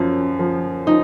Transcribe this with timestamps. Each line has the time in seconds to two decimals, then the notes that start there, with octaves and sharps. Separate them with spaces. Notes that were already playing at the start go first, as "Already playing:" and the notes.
Already playing: F#2 F3 C#4
0.39 F3
0.86 F3 D#4